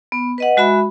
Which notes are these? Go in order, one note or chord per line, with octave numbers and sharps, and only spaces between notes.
B3
B4 D#5 F#5
G#3 F#4 E5 B5